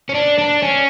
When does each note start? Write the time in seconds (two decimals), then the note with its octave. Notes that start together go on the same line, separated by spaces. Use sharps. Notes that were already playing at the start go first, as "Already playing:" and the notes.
0.09 C#4
0.14 D4
0.38 D4
0.62 C#4